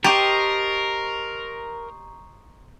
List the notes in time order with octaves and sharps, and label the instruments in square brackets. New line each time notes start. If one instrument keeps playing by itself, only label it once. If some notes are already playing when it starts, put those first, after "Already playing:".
[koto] G4 [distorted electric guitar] A#4 [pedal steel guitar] C5 D#5 A5 [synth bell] A#5 C#6